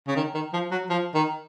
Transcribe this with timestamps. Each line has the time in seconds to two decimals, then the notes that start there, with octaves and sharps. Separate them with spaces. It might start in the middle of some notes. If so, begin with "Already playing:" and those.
0.07 C#3
0.16 D#3
0.34 D#3
0.53 F3
0.71 F#3
0.89 F3
1.14 D#3